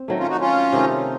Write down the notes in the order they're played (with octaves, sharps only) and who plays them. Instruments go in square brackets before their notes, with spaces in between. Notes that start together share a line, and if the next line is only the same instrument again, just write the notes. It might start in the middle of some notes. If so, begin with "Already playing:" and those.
Already playing: [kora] C4
D#3 F#3 A3
[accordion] C#4 F4
D#4 F#4
C#4 F4
[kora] C3 D#3 A3 D#4